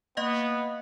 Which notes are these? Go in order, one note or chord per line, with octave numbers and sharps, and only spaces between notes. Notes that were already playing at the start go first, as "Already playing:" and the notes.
A#3 B3 D#5 F5